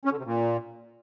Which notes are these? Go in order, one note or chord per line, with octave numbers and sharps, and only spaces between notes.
C#4
D3
C3
A#2